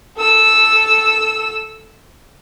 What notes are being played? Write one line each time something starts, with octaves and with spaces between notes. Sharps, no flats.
A4 E6